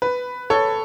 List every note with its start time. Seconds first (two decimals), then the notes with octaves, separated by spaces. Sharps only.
0.02 B4
0.50 A4 C#5